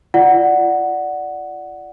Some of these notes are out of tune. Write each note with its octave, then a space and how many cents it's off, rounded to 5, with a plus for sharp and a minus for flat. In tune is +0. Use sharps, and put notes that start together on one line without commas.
F4 -35 D5 +0 F#5 +0